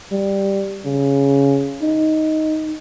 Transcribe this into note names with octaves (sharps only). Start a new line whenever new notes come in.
G3
C#3
D#4